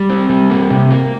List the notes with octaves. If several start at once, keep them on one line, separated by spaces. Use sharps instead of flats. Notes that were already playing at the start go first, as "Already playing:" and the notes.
Already playing: G3
C4
G3
A#3
C3
A#3